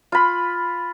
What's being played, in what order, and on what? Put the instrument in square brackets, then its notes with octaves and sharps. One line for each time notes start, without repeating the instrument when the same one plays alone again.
[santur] F4 B5